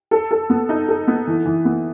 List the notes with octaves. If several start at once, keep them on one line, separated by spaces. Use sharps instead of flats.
A4
A4
B3
D#4
A4
B3
E3
E3
B3